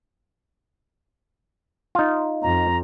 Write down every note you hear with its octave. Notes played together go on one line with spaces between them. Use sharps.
D#4 F4
F2 A#5